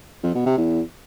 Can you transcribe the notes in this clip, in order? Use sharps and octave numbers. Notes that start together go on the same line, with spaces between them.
F2
B2
C3
E2